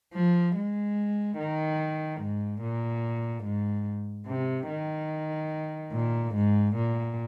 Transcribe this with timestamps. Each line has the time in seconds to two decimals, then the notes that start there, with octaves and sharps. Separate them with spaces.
0.14 F3
0.56 G#3
1.39 D#3
2.21 G#2
2.62 A#2
3.45 G#2
4.28 C3
4.69 D#3
5.93 A#2
6.35 G#2
6.76 A#2